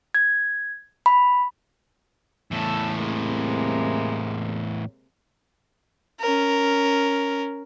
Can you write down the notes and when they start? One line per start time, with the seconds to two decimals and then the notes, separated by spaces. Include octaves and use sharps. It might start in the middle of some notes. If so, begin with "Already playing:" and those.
0.15 G#6
1.06 B5
2.51 E2 A2 A4 E6
2.97 C3 G#3 A#3
6.20 C#4 A#4